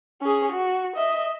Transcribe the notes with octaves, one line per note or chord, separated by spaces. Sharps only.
C#4 G#4
F#4
D#5 E5